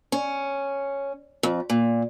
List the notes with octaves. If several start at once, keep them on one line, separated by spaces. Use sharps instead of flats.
C#4
F2
A#2